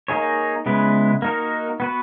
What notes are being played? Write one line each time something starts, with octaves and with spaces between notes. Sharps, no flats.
A#3 D#4 G#4 C#5
C#3 G#3 B3 E4 B4
A#3 D#4 F#4 A#4
B3 F#4 B4